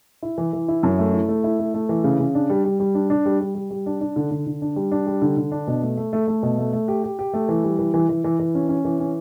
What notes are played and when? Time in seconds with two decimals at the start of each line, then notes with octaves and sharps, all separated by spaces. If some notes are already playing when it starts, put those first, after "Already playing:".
0.22 E4
0.38 E3
0.53 E3
0.68 E4
0.83 F#2
0.99 A3
1.13 E4
1.29 A3
1.44 E4
1.59 A3
1.74 A3
1.89 E3
2.04 C#3
2.19 C#3
2.35 D4
2.50 G3
2.65 G3
2.80 G3
2.95 D4
3.10 D4
3.26 G3
3.40 G3
3.55 G3
3.71 G3
3.86 D4
4.01 D4
4.16 D3
4.31 D3
4.46 D3
4.62 D4
4.76 G3
4.92 D4
5.07 G3
5.22 D3
5.37 D3
5.52 D4
5.67 B2
5.82 A3
5.97 A3
6.13 A3
6.28 A3
6.43 B2
6.58 A3
6.73 A3
6.88 G4
7.04 G4
7.19 G4
7.33 A3
7.49 E3
7.64 G3
7.79 E3
7.94 E3
8.09 E3
8.24 E3
8.40 E3
8.55 C#4
8.69 C#4
8.85 E3
9.00 C#4